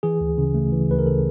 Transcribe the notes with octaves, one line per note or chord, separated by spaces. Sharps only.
E3 G#4
D2
C#3
A3
E3
D2 B4
A#4
C#3 A4